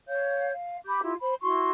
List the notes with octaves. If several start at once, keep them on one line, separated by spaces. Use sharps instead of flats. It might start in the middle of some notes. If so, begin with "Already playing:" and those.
C#5 F5 G6
F5
G4 B5 D6 G6
E4 F4 G4
C5 B5
E4 F#4 C6 C#6